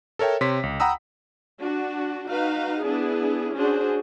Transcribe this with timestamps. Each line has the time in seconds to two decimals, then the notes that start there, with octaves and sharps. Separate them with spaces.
0.19 A4 A#4 C#5 E5 G5
0.41 C3 C#5 C6 B6
0.63 C#2
0.80 F#5 G5 A#5 B5 D#6 E6
1.61 D4 F#4
2.31 D#4 F#4 B4 F5
2.82 B3 D4 E4 G#4
3.54 C#4 D4 F#4 G#4 C5